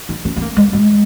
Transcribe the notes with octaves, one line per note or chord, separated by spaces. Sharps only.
D#4
C#4
B3
A#3
G#3
G#3